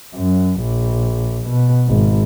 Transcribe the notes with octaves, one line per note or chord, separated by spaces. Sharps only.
F#2
A#1
B2
G#1